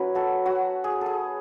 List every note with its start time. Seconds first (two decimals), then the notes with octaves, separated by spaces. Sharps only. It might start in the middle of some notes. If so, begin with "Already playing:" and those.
Already playing: F#3 C#4 E4 B4
0.15 F#4 A4
0.46 F#4
0.84 G#4
1.01 G#4 A4